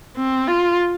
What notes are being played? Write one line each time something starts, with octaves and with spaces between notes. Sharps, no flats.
C4
F4